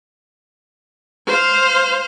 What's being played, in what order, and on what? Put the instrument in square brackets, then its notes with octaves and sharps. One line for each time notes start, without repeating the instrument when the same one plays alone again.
[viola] C5 F5